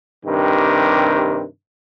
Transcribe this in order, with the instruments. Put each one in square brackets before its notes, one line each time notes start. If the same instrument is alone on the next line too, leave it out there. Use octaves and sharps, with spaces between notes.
[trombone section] G2 C3 D#3